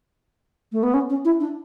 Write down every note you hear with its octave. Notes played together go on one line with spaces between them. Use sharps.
A3
B3
C#4
C#4
E4
D4